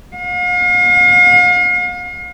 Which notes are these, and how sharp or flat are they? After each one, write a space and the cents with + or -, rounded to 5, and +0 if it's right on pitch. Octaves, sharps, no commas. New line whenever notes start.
F5 +40